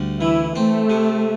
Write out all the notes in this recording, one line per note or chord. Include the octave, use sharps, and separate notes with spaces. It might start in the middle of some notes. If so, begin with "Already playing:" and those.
Already playing: D2 G3
E3 E4
A3 C4
C3